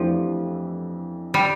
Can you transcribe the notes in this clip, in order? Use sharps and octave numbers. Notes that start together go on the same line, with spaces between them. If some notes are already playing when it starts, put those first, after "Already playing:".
Already playing: F2 E3 F3 A3 D4 G4
D3 G3